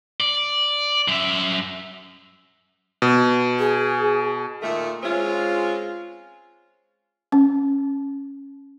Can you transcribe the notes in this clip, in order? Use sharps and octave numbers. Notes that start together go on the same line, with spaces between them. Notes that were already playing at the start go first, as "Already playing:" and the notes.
D5
F#2 E5
B2
G#4
A#2 D#3 A3
G#3 C4 C#4 F4
C#4